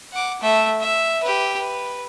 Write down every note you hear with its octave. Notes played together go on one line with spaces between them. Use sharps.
F#5 D6
A3 E5
E5
G4 B4
B4